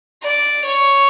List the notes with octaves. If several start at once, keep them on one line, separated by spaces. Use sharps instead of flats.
D5
C#5